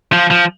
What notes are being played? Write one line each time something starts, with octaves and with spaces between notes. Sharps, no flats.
F3
F3